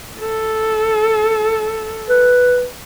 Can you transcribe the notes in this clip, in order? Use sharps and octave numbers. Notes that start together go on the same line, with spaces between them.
A4
B4